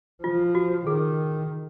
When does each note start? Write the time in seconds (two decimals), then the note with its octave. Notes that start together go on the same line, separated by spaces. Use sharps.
0.24 F3 F4
0.55 F#4
0.86 D#3 G#4